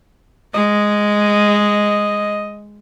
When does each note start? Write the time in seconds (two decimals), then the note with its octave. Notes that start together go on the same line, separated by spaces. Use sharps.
0.55 G#3 D#5